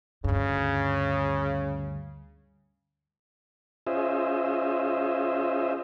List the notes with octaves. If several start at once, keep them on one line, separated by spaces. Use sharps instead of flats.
D2 G2 C#3
C#4 F4 G#4 C5 D#5 E5